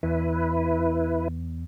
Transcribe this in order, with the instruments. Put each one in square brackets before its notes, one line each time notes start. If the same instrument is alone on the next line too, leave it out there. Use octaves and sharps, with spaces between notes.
[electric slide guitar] E2 [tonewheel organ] E4 B4